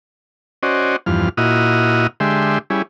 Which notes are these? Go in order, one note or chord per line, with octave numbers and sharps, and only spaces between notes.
C#4 F#4 C5 D5 D#5
E2 G2 F3 F6
A#2 E4 F#4 D#5 D#6 F6
D3 G#3 G4 E5 C6
G3 C#4 E4 G#4